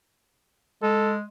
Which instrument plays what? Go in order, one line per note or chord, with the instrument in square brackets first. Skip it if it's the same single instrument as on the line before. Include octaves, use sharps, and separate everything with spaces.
[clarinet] G#3 [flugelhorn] A4